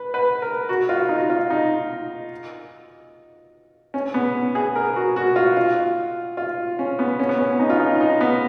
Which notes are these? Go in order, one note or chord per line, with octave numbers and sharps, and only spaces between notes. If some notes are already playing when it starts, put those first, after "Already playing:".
Already playing: B4
B4
A#4
F#4
F4
D#4
F4
D#4
C#4
B3
G#4
A#4
F#4
F#4
F4
F4
F4
C#4
B3
C#4
B3
C#4
D#4
F4
D#4
D#4
B3